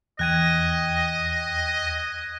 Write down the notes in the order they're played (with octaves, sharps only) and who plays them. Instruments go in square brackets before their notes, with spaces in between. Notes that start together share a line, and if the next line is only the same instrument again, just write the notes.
[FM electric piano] E2 G5 [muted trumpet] D#5 [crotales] F#6 G#6 D#7